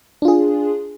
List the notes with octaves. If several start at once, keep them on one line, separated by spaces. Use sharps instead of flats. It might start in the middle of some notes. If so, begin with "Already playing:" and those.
D4 F4 G#4